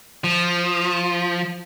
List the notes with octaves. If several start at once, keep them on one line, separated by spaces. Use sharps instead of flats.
F3